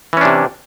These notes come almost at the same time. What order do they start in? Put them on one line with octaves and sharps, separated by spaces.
E3 C#4 D4 C3